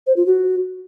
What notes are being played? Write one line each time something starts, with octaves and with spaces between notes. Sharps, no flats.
C5
F4
F#4